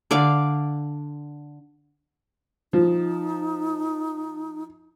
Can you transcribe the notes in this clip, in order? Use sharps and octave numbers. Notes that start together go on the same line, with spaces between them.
D3 D5 F5
F3 D#4